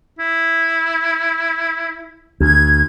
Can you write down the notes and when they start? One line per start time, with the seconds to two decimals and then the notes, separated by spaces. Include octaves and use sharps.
0.19 E4
2.40 D2 G#6